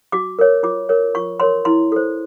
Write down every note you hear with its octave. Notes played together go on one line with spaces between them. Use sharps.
F#4 D6
A#4 C#5
F4 D6
A#4 C#5
F4 C#6
A#4 C#5 C6
E4 C6
A4 C5